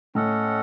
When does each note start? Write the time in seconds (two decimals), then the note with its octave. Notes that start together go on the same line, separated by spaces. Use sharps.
0.15 A2 C#4 A4 D#5 F#5